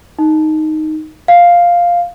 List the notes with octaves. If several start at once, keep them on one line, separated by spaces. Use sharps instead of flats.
D#4
F5